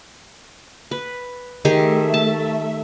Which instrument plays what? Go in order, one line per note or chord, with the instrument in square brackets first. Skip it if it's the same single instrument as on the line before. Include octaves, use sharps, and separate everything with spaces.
[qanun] B4
[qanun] D#3 G4 G#4 [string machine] A3 E5
[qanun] A5